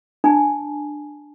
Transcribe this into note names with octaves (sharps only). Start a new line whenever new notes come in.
D4 G#5 A5